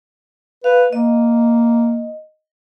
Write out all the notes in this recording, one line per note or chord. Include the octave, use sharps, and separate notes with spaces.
B4 F5
A#3 D#5